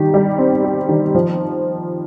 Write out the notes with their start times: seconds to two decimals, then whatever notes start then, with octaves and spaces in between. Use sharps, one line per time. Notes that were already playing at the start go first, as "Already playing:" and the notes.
Already playing: D#3 G3 G4
0.14 G3
0.38 C4
0.64 G4
0.89 D#3
1.14 F3